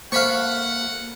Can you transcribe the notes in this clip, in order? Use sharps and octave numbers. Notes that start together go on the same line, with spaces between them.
A#3 A4 C5 F5 F#5 B5 C#6